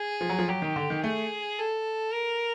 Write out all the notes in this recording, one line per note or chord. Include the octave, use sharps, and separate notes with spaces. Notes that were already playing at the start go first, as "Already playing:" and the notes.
Already playing: G#4
F3
F#3
F3
F#3 G4
D#3
D3
D#3
A3 G#4
A4
A#4